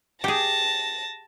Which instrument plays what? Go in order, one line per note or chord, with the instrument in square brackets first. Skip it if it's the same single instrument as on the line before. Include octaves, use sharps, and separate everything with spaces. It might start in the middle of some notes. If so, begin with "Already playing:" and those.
[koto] G4 G#4 [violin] A5 A#6